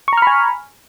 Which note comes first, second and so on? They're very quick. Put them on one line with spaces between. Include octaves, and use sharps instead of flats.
C#6 A#5 F6 B5 G#5